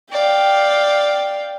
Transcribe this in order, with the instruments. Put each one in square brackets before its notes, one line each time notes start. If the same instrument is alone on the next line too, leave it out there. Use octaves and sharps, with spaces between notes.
[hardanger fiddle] D5 F5 [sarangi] G5